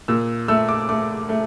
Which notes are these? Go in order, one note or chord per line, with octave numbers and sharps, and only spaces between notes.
A#2 E6
A3 E6
D6
A3 D6
A3